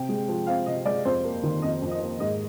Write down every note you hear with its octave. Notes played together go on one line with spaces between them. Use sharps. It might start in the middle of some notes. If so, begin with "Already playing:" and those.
Already playing: C3 G5
G#3
F3
C4 F5
C3 D#5
G#3 D5
F2 C5
A#3
D#3
F2 D#5
F2
D#5
A#3
G#2 D#5